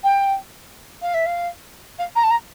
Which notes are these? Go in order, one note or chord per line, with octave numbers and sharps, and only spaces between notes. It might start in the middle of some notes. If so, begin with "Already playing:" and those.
G5
F5
E5
F5
F5
A#5
A5
A#5